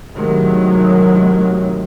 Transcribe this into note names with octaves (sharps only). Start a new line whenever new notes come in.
A2 C3 D#3 F#3 G#3